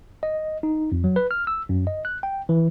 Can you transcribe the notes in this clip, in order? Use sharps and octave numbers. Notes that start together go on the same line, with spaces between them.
D#5
D#4
F2
F#3
B4
F6
E6
F#2
D#5
F#6
G5
E3